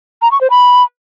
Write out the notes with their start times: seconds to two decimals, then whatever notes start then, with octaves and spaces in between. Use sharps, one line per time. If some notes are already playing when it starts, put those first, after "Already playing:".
0.22 A#5
0.31 C#6
0.41 C5
0.50 B5